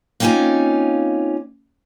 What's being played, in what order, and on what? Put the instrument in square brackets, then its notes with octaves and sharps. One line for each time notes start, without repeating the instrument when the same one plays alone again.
[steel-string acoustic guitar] A#3 C4 C#4 D#4 F4 G#5